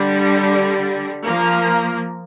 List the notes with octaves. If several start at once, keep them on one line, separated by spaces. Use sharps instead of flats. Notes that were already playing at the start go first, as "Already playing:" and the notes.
Already playing: D3 G3
F3 A#3